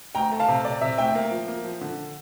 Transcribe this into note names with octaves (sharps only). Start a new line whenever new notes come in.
D2 G5 A#5
A3
F5 A5
C3
C3 D5
C3 E5
D2 E5 G5
A#3
F3
A#3
F3
D3